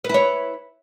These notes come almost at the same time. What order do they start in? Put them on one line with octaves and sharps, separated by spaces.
B4 E4 C#5